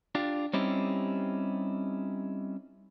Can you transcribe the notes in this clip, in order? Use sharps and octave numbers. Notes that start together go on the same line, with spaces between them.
D4 F4 G4
G3 C4 C#4 D#4 E4 G4